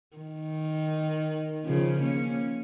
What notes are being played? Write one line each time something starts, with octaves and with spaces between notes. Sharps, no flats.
D#3
C#3 F3
A#3 C#4